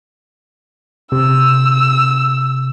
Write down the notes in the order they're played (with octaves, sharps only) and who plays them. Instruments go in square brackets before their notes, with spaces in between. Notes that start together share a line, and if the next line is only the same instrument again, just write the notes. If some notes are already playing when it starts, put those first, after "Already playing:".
[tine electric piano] C3 [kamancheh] E6